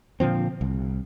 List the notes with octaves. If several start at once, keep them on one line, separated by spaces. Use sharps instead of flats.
A#2 D3 F3 C4
C2